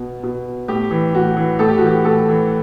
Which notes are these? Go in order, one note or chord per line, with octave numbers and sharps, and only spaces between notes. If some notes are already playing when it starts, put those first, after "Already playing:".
Already playing: B2
B2
A2 G4
E3
A2 F#4
E3
A2 A4
G4
F#4
E3 G4
A2 A4
E3